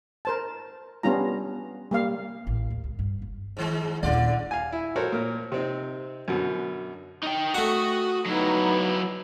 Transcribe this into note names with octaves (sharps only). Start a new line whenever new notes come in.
A#4 C5 A5
G3 B3 C#4 D4 F4 A#5
G3 A#3 F5
A1
D#2
C#2
G2
F#1
G#2 D#3 G#3
D#1 D#2 D3 E4 D5
F5 G#5
E4
F#4 A4 A#4 C5 C#5
A#2 A#4
C3 C4 D#4
F#2 B2 D3
D#4 G5
A3 F#4 F#5 D#6
F#3 B3 D#4 E4